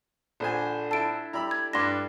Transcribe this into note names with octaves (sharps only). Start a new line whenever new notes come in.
A#1 D3 C5 G#5
E4 A4 A5 D7
G3 E4 A#5 B5 E6
G#6
G2 D4 C6 A#6